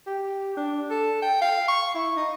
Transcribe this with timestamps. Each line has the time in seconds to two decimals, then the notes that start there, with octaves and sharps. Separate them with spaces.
0.06 G4
0.56 D4
0.90 A4
1.22 G5
1.41 F5
1.68 C#6
1.95 E4
2.16 D#4